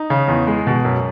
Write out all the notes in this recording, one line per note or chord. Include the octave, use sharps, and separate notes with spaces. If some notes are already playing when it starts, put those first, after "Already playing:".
Already playing: D#4
C#3
E2
G#3
B2
F#2